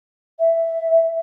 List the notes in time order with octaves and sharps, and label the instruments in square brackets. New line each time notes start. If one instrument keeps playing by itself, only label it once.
[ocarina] E5